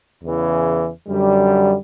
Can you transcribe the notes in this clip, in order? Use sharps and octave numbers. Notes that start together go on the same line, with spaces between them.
E2 C#3 E3
F#2 D3 G3